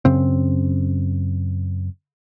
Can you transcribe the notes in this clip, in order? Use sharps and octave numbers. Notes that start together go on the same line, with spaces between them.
F#2 C#3 C4